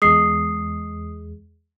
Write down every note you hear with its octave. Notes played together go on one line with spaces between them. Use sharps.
E2 G#3 D#6 C7